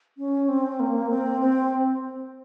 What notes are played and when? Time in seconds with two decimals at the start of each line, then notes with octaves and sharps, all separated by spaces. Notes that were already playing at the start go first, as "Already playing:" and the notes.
0.18 C#4
0.48 C4
0.80 A#3
1.10 C4
1.41 C4